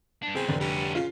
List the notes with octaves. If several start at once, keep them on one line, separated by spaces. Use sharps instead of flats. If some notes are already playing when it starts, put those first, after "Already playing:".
G2 D4
E2 C#3 C4 G#4
F1 D3
D2 G3 C#4
C#3 F4